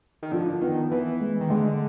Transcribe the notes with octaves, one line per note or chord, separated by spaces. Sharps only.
D#3
D3 F3
D#3 B3
E3 B3
G#3
D#3
D3 G#3